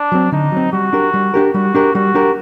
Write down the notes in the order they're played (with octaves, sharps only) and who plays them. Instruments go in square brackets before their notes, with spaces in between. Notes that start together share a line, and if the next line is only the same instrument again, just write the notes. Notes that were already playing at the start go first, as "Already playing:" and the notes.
Already playing: [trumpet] D4
[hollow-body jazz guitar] F#3 C4
[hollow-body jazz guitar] D3 [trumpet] D#4
[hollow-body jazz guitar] F#3 C4
[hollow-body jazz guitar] G3 [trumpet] F#4
[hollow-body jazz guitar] D4 G4 A#4
G3
D4 G4 A#4
[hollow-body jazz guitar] G3 [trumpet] F#4
[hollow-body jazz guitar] D4 G4 A#4
[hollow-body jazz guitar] G3 [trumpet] F#4
[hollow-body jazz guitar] D4 G4 A#4